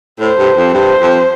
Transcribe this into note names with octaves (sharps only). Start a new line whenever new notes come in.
A2 C5
G2
F2
G2 C5
F2